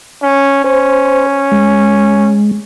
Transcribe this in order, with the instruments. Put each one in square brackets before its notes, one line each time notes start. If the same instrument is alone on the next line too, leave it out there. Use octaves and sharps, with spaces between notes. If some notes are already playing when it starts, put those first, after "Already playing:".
[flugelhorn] C#4
[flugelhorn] C#4 [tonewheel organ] C5
[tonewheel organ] G#3